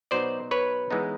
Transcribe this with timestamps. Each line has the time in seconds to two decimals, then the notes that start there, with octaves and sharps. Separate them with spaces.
0.11 B2 F#3 B3 D#4 C5 D5
0.51 B4 C#5
0.91 E3 G#3 B3 D#4